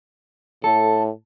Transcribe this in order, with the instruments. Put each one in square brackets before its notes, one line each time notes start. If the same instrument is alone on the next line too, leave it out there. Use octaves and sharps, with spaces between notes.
[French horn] A2 [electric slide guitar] A4